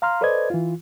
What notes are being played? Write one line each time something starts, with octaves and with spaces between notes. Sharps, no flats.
F5 A#5 C6 F6
A4 B4 C5 D5 D#5 G#6
E3 F4